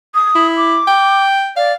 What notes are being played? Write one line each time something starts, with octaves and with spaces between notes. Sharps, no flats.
D#6
E4
D6
G5
D5 F5